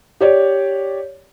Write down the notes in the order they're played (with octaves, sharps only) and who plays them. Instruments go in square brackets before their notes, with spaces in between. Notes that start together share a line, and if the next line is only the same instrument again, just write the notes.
[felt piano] G4 C#5 D5